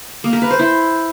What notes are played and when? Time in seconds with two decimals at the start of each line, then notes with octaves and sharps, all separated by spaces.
0.24 A#3
0.33 A#4
0.42 B4
0.51 C5
0.59 E4